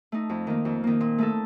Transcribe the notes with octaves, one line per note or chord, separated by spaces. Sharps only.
A3 D#4
F2
D#3 A#3
F2
D#3 A#3
A#2
A3 D#4 A4